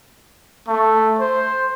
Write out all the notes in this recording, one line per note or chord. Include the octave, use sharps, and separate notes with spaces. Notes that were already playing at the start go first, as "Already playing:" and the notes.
A3
C5